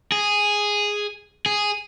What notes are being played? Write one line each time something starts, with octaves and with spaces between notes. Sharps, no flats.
G#4
G#4